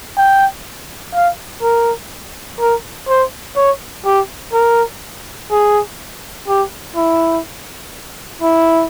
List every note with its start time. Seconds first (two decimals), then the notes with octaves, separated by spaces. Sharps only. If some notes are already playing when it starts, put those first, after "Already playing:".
0.17 G5
1.14 F5
1.63 A#4
2.60 A#4
3.09 C5
3.56 C#5
4.05 G4
4.53 A#4
5.51 G#4
6.48 G4
6.96 E4
8.42 E4